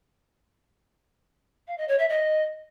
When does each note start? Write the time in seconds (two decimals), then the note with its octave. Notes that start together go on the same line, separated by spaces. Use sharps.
1.68 F5
1.78 D#5
1.88 C#5
1.99 E5
2.09 D#5